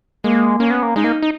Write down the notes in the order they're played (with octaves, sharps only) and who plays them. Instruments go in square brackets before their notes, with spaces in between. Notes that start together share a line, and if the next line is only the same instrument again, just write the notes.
[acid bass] G#3 [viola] A#3
[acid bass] A#3 [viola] C#4
[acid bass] B3
A#3
[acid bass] G#3 [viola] D#4
[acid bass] A#3
D#4